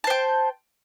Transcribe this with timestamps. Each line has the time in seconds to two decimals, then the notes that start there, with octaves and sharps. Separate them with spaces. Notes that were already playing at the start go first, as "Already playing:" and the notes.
0.04 A5
0.07 C5
0.10 G5